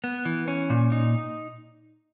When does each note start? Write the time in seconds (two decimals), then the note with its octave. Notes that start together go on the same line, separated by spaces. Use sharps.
0.04 B3
0.25 E3
0.48 C#4
0.70 A#2
0.92 D#4